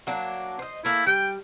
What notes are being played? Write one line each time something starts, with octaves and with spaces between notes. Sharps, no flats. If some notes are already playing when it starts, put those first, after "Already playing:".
F#3 A#3 D4
C5 D#5
A3 A#3 E4
G3 G5